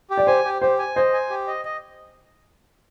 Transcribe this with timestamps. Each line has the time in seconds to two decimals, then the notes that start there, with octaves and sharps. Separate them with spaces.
0.10 G4
0.18 D5
0.27 C5 G#5
0.44 G4
0.62 G4 C5
0.79 G#5
0.96 C5 D#5
1.13 G#5
1.30 G4
1.47 D#5
1.65 D#5